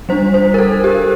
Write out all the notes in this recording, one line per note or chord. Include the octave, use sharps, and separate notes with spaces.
G3 D4 C5
C5
A#4
A4
G4